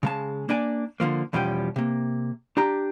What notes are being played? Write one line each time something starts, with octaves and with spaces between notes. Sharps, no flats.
C#3 G#3 A5
A#3 D4 D5 G#5
D3 D#3 F3 A#3
E2 B2 F3 G3 C#4 G5
C3 A#3
D4 G4 A#5